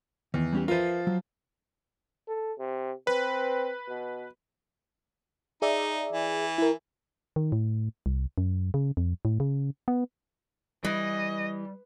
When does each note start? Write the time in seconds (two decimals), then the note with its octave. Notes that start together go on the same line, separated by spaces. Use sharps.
0.34 E2 D#3
0.53 G3 C#4 G4
0.68 F3 F4 A#4 B4 E5
1.07 F#3
2.28 A4
2.58 C3
3.07 C4 B4
3.88 B2
5.62 D#4 G#4 D5 E5
6.13 E3
6.58 E4 A#4
7.36 D#3
7.52 A2
8.06 C2
8.38 F#2
8.74 C#3
8.97 F2
9.25 A2
9.40 C#3
9.88 B3
10.85 E3 G3 D#5